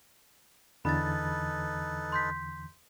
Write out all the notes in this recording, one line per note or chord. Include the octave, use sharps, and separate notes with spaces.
E2 D3 E3 D#4 A4 B4 B5 A6
C6 G6 B6